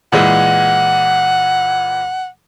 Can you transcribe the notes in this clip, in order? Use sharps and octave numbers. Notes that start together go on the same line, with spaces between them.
A#2 E3 G#3 F#5